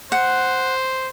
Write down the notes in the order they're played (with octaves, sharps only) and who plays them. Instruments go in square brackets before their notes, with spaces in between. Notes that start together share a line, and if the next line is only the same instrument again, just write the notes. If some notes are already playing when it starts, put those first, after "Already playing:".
[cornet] C5 [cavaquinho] F#5